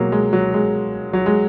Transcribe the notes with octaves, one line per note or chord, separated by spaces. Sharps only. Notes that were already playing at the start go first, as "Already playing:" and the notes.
Already playing: B2 F#3 G#3 A#3
G#3
F#3
G#3
F#3
G#3